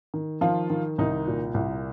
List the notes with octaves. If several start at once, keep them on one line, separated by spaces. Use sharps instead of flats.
D#3
D#3 F3 F4
D#3
C2 D#3 D#4
A#2
C2